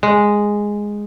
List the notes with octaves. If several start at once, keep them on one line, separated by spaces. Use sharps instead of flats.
G#3